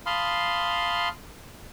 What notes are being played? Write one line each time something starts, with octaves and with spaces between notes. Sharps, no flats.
F5 A5 B5 C6 D#6 F6